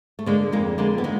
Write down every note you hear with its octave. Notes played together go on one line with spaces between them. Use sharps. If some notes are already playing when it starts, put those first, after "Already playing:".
A3
D3 G#3 A#3
F2 G#3 A#3
D3 G#3 A#3
B3
D#3 G#3 A#3